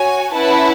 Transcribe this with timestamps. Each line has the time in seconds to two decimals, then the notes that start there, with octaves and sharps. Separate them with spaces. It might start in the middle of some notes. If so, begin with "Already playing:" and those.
Already playing: F#4 C#5 G#5
0.33 C#4 E4 B4 F#5 A5